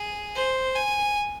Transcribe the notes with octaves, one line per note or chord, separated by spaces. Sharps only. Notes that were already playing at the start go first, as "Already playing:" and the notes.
Already playing: G#4
C5
G#5